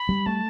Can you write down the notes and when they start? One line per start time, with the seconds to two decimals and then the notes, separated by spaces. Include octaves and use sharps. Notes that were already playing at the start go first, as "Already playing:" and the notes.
Already playing: B5
0.09 G3
0.26 A3 A5